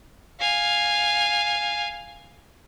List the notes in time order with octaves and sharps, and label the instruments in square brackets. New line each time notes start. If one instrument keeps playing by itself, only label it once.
[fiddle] F5 G#5